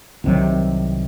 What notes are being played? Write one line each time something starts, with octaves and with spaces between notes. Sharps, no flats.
C2 C3 D#3 F#3